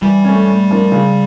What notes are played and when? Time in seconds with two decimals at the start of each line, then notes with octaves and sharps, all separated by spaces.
0.02 E3 G3
0.24 A3 C#4
0.47 A2
0.71 F3 A#3 D4
0.92 C#3